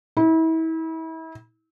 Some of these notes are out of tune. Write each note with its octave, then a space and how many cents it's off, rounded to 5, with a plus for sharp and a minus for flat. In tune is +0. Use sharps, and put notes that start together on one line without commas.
E4 -35